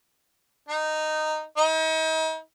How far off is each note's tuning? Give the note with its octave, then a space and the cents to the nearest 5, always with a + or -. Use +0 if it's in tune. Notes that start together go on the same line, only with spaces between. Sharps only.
D#4 -10
D#4 +40